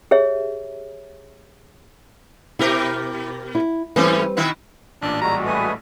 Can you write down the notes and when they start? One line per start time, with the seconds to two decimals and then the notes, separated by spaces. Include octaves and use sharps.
0.11 G4 G#4 C#5 E5
2.59 B2 E4 G4 A#4
3.55 E4
3.96 G#2 E3 G3 C4 C#4 B4
4.37 B2 D#3 E4
5.02 A1 A#2 D4
5.21 G3 G#3 F#4 A#5
5.43 A3 B4 G#5 D#6